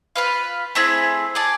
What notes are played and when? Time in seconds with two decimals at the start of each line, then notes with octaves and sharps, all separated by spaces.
0.16 F4 B4 F5
0.75 A3 C4 E4 G#4
1.35 G#4 D5 A5